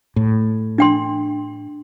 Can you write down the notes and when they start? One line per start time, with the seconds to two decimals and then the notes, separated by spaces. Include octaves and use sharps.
0.16 A2
0.78 D4 G5 C6